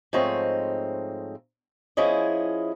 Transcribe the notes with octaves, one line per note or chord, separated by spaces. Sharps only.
G#2 F3 A3 C4 C#5 D#5
F3 C#4 E4 G#4 D#5